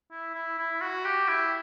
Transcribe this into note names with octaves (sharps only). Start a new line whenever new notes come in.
E4
E4
E4
F#4
G4
E4